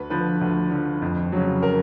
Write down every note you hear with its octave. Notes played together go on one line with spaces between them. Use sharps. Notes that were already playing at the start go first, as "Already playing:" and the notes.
Already playing: D2 B4
D3 F3 B4
D2
D3 F3
F2
C#3 F#3
A#4